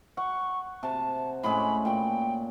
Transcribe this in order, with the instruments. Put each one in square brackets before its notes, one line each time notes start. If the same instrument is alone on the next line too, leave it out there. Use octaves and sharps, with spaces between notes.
[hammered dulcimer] F#5 [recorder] C#6
[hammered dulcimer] C3 [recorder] A5
[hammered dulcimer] A2 G#3 C#4 [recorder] B5
[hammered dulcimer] A#2 [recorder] G5